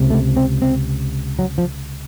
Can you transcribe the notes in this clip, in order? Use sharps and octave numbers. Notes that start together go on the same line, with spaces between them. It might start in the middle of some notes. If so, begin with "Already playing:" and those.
Already playing: C#2 C3
A3
C4
C4
F#3
F3